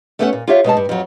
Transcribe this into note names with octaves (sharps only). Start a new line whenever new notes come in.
A3 B3 C#4 A4 C#5 F#5
A#2
F4 G4 C#5 E5 F5
B2 G#3 D#4 A5
G2
F2 F#3